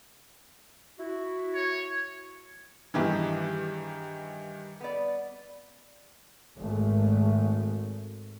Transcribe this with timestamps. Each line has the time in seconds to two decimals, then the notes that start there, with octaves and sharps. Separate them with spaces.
0.99 E4 F#4
1.55 C#5
2.94 G2 D#3 E3 E4 G4 G#4
4.81 B3 D5
6.58 G#1 A3